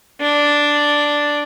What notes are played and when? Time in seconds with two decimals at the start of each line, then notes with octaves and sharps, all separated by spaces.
0.21 D4